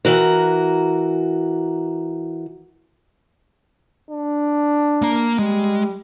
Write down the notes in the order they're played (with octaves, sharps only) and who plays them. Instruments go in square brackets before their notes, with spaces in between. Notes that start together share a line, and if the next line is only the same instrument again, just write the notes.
[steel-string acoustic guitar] E3 F#4 A#4
[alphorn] D4
[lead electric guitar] A#3 A#5
[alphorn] G3 [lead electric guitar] G#3